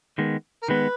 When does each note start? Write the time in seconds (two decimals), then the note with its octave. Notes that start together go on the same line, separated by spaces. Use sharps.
0.18 D#3 G#3 B3
0.63 A#4
0.68 D#3 G#3 B3 B4